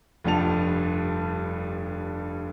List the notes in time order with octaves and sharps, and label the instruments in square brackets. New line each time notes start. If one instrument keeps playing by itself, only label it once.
[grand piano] F1 G2 F3 G3 A5 F7